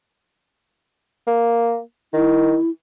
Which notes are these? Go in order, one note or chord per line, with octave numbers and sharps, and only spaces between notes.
A#3
D#3 E4